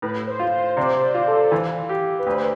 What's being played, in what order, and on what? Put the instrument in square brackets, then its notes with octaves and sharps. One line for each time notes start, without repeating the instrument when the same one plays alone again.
[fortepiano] A2 [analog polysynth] B4
[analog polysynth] C5
[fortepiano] F4
[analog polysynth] C5
[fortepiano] C3 [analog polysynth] D5
[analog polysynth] C5
[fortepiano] F4
[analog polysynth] A4
[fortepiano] E3
G4
[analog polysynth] B4
[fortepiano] D2 [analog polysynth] C5